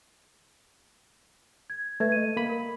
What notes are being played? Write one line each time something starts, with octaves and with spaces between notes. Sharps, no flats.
G#6
A3 B4 E5 G#6
D#5 D#7
A#3 B5
A#4